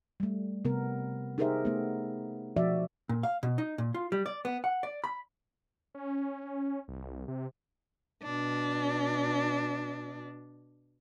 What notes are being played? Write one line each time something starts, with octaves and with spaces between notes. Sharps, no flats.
G3 A3
C3 B3 A#4
D#4 G4 G#4 A#4 C5 E5
A3 B3
B2 F3 F#4 D5 E5
A#2
F5
B2
D#4
A#2
F4
G3
D5
B3
F#5
D5
B5
C#4
C2
C3
B2 D4